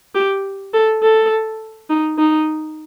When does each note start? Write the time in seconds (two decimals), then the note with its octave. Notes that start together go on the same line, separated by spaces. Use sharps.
0.15 G4
0.73 A4
1.03 A4
1.90 D#4
2.18 D#4